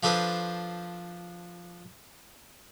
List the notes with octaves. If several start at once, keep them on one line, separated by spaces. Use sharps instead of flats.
F3 D4 A4 B4 C5 D#6